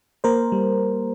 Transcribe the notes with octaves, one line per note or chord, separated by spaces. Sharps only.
A#3 A#4 C5
G3